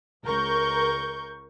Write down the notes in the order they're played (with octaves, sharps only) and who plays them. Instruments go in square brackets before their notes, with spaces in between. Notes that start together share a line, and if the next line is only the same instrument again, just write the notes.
[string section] C#2 A#4 C#6 G6